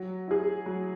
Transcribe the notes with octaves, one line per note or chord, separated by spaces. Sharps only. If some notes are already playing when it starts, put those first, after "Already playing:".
Already playing: F#3
E4 G#4
F#3